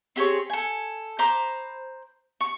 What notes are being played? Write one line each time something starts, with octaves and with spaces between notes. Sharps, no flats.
C4 G4 G#4 C#5
A4 G#5
C5 A#5 B5 D6
C#6